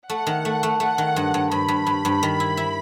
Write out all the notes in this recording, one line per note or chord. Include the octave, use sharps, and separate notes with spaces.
A3 F#5
D#3
A3
A3
A3 F#5
D#3
G2
G2
G2 B5
G2
G2
G2
D#3
E4
E4